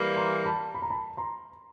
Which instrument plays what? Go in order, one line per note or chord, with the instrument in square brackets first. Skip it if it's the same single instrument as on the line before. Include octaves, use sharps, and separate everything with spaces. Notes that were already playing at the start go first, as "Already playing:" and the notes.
Already playing: [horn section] E3 G3 A#3
[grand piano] A#5 C6
A5 B5
B5
A#5
A5 B5
A#5 C6